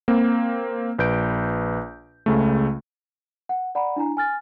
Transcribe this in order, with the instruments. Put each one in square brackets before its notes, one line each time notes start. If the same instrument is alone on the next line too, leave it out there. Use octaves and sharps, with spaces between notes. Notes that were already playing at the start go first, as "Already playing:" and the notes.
[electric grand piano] A#3 C4
A#1 B4 G6 D7
C#2 C#3 A3
[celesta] F#5
D5 F#5 A#5 B5
D4 E4 G#5 A#5
G#5 F6 A6